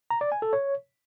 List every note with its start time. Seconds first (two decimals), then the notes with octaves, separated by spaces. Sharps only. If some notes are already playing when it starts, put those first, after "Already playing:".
0.10 A#5
0.21 D5
0.32 G#5
0.42 A4
0.53 C#5